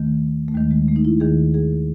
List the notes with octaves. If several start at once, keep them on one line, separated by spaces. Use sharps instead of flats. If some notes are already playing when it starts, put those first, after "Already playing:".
Already playing: D#2 D#3 A3
A3
D#2 D#3 G#3
G#3
A3
D#4
E4
D#2 D#3 G#4
G#4